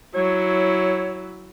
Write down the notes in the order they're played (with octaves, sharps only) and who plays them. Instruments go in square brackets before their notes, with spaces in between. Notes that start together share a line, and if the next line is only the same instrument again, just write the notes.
[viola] F#3 E4 [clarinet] C#5